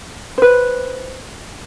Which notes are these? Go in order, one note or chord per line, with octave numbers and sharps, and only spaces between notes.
B4 C5